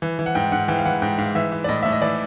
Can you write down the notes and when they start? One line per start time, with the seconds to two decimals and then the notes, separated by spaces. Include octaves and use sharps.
0.02 E3
0.19 E3
0.26 F#5
0.35 G#2 G5
0.52 G#2 F#5
0.68 E3 G5
0.79 F5
0.85 E3 F#5
1.02 G#2 G5
1.18 G#2 F5
1.35 E3 E5
1.52 E3
1.64 D5
1.68 A2 D#5
1.83 A2 E5
1.92 D#5
2.02 E3 D5